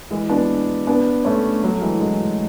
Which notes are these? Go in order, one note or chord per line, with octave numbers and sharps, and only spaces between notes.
E3 G#3
B3 D4
B3 D4
A3 C#4
F#3 A3
E3 G#3
E3 G#3